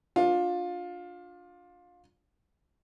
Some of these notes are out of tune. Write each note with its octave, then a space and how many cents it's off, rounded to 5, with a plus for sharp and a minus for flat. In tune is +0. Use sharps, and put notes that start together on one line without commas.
D4 +0 F4 +20